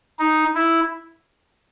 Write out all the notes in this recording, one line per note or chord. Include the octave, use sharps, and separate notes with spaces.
D#4
E4